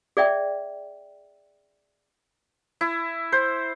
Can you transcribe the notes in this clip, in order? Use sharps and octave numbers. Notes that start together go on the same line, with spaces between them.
G#4 D5 E5 G5
E4
C5